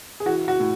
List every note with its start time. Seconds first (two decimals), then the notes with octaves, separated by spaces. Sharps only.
0.20 G#4
0.26 E3 F#4
0.48 F#4
0.60 A2